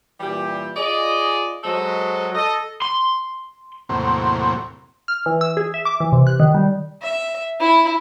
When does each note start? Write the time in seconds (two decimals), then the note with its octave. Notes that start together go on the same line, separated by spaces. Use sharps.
0.21 A#2 E3 G3 G4
0.76 F4 G#4 D5 D#5
1.64 F#3 G#3 A4 C5 D#5
2.35 A4 D#5
2.82 C6
3.89 E2 A2 C3 F#3 A#3 C4
5.08 F6
5.26 E3
5.41 E6
5.57 G#4
5.74 E5
5.85 D6
6.00 E3
6.13 C3
6.27 F#6
6.40 D#3
6.54 G3
7.02 E5
7.60 E4